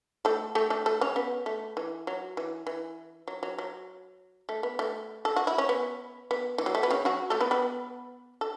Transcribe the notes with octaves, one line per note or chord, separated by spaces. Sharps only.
A3 A4
A3 A4
A3 A4
A3 A4
C#3 C#4
B3
A3
E3
F#3
E3
E3
F#3
F#3
F#3
A3
B3
A3
A4
F#4
E4
C#4
B3
B3
E3
F#3
A3
B3
C#3 C#4
F#3 F#4
A3 A4
B3 B4
B3 B4
A4